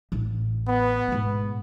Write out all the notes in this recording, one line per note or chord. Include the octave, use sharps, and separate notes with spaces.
A1
B3
G#2 B2